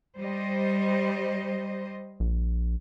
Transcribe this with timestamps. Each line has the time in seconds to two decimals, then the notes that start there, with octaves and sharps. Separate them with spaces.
0.17 G3 C5 D#5
2.20 A#1